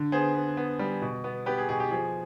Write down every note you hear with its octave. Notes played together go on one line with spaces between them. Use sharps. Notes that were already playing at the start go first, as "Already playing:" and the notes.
Already playing: D3
B3 G#4 C5
B3
B3
G3
B2
B3
B3 G4 B4
G#4
B2 G#4
G4
F3 G#4